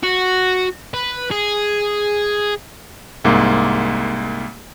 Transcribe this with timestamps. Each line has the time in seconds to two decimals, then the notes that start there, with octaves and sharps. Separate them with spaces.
0.03 F#4
0.94 B4
1.31 G#4
3.25 C2 G#2 A#3